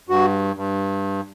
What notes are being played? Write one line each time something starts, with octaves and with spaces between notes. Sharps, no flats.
G2 F#4
G2